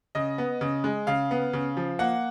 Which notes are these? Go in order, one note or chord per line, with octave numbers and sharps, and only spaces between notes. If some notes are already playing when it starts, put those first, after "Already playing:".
C#3 D#5
B3
C#3
G#3
C#3 F5
B3
C#3
F3
A#3 F#5